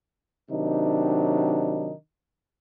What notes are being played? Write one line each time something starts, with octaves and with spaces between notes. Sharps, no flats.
C3 D#3 F#3 D4 D#4